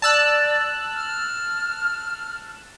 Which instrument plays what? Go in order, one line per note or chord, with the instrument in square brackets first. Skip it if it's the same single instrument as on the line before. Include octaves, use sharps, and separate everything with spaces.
[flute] D5 [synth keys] A5 E6 F#6
[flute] F6